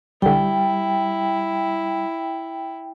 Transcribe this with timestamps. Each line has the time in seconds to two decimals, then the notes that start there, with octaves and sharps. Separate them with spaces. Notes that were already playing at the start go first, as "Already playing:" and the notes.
0.22 B1 D3 G3 E4 G5